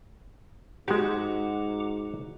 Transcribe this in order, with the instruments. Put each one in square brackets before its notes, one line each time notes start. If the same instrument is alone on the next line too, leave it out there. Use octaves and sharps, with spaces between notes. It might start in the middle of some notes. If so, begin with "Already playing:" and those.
[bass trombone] G#2 [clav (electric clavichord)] G#3 G4 [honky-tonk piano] F#4 [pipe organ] F#5 A#5 D6